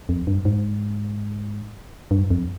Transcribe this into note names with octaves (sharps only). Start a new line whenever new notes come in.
F2
G2
G#2
G2
F2